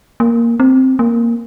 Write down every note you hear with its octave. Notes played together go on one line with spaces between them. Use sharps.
A#3
C4
A#3